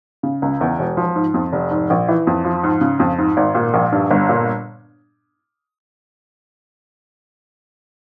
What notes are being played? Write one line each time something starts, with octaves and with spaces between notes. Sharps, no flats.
C#3
C#2
E2
E1
F3
G#2
F2
F1
G#2
A#1
E3
F2
F3
G#2
C#3
F2
G#2
G#1
A#2
A#1
G2
G1
A#2